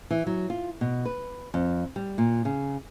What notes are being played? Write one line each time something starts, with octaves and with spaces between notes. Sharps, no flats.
E3
F#3
F4
B2
B4
F2
G3
A#2
C#3